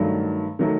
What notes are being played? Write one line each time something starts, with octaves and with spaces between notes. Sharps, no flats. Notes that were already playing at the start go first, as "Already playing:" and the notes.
Already playing: G2 D#3 F#3 A3
D#3 F#3 A3